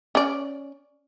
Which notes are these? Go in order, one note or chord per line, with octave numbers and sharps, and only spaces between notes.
C#4 D5